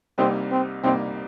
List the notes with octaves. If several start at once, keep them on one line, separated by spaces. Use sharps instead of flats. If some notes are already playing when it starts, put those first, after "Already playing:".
C2 C3 G3 A#3 C4 D#4
C4
C2 C3 G3 A#3 C4 D#4